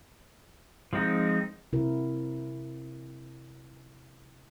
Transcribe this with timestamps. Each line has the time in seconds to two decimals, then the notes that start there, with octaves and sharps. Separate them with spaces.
0.93 F3 G#3 C4 D#4
1.73 C3 E4 F#4 A#4